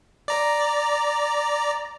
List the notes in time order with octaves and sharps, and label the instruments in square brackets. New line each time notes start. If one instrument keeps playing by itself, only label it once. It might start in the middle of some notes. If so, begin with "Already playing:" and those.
[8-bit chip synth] D5 A#5